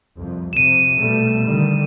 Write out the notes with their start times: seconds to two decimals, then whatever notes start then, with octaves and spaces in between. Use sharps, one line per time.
0.18 C2 F2
0.53 F2 C3 D#7 E7
1.00 B2 G3 A3
1.48 D3 D#3 G3